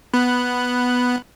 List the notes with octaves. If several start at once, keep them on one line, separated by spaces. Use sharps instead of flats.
B3 B5 F#6